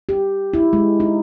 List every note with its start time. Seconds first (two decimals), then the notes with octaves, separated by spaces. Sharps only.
0.09 G4
0.54 E4
0.73 G#3
1.00 D#4